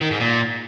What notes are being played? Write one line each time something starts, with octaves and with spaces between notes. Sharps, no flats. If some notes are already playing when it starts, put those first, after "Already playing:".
D#3
G#2
A#2